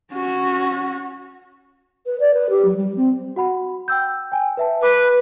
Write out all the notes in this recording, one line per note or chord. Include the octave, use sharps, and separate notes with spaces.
C#4 F#4
B4
D5
B4
G4
F#3
G3
C4
F#4 F#5 B5
G5 E6 G6
G5 G#5
B4 E5 A5
B4 D6